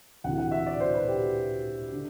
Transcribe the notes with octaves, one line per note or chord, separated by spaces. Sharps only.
D2 C3 E3 F#5
F#5
E5
D5
C5
B4
G4
D3